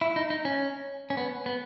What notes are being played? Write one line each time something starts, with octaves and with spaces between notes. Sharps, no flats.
E4
D#4
D#4
C#4
C#4
B3
B3